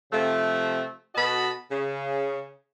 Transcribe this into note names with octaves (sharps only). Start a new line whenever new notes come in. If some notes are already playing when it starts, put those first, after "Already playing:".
C3 F3 A3
B2 F#4 A4 D#5 A5 B5
C#3